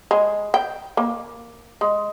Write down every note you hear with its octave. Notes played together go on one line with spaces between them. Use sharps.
G#3
G5
A#3
G#3